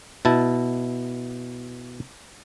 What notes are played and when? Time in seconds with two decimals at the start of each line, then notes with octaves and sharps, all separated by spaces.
0.25 B2 E4 A5